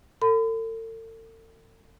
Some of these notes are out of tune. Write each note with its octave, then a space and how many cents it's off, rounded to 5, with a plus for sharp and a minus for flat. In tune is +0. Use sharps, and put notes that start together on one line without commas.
A4 +40 B5 +40